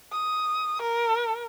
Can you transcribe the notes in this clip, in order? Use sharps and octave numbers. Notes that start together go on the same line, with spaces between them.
D#6
A#4